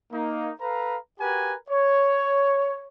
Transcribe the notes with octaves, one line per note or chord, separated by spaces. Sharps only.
A#3 D#4
A4 B4 F5 A#5
F#4 G4 A#4 B4 G#5
C#5